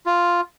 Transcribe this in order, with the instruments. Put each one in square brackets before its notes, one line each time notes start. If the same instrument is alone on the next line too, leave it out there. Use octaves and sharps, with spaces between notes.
[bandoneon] F4